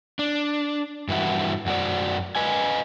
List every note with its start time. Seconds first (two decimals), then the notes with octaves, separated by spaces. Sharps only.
0.19 D4
1.08 G2 E3 E4 F#4
1.66 F#2 F#4 D5
2.35 B4 D#5 G#5